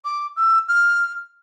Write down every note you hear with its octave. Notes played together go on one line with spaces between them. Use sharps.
D6
E6
F6